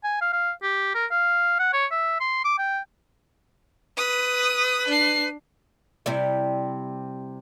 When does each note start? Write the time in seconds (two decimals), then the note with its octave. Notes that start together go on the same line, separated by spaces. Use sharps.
0.04 G#5
0.21 F5
0.33 F5
0.62 G4
0.95 A#4
1.11 F5
1.59 F#5
1.73 C#5
1.91 E5
2.20 C6
2.44 D6
2.58 G5
3.97 B4 D#6
4.87 D4 C7
6.06 C3 G3 E4